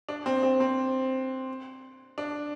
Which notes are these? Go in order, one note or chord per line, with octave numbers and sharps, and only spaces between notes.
D4
C4
C4
C4
D4